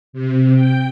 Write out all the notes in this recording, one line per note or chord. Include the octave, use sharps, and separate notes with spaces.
C3
G5